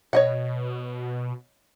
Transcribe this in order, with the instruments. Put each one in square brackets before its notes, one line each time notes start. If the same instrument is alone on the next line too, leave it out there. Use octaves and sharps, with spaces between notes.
[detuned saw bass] B2 [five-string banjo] C#5 D#5 F#5